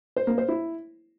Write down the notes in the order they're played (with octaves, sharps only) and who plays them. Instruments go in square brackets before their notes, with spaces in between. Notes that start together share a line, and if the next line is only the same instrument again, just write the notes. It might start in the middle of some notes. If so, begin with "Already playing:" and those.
[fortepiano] C5
A#3
C5
E4